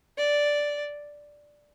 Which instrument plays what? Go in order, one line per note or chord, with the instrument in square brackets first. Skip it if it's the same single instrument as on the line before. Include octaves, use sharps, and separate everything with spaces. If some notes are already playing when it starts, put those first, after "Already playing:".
[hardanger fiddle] D5